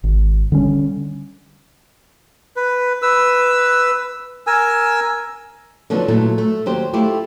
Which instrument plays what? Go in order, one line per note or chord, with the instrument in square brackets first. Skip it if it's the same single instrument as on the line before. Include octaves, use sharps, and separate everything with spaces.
[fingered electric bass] G#1
D3 G3 C#4
[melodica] B4
B4 E6
A#4 G#5 E6
[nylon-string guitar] D3 F3 F#3 B3 D4 D#4
A#2 F#3 A3 E4 A4
A3
D#2 F#3 G4 C5
A3 E4 F4 G4